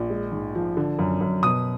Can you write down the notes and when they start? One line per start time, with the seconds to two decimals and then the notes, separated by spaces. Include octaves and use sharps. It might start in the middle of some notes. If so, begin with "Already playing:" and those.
Already playing: A#1
0.10 G#3
0.32 G#2
0.55 F3
0.77 D3
0.99 F#2
1.21 F#2
1.43 B2 D#6